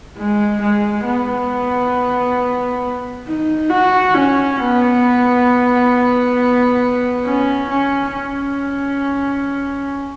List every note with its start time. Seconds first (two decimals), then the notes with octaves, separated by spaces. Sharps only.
0.17 G#3
0.61 G#3
1.05 B3
3.27 D#4
3.70 F#4
4.14 C#4
4.60 B3
7.24 C#4
7.69 C#4
8.12 C#4